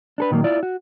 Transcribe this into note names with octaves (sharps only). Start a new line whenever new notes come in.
D4 A4 B4
A#2 D#3 F#3 A3 A#3
E4 F4 D5
F#4